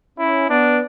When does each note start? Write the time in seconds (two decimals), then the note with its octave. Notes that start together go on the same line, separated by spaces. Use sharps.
0.19 C#4 E4
0.49 B3 D4